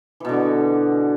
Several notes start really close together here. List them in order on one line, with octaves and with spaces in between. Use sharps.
E3 B2 D3